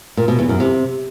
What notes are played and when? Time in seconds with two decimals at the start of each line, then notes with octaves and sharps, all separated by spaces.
0.17 A#2
0.28 B2
0.39 E2
0.49 F#2
0.60 C3